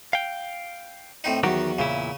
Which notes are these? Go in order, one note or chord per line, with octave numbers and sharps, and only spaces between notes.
F5 G5
A2 C4 D#4
E2 D#3 F#3 F#4 G4
E2 A#2 C#3 E4